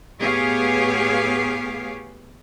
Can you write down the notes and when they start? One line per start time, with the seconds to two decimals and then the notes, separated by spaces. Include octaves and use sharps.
0.19 A2 B3 G4 G#4 C#5 F5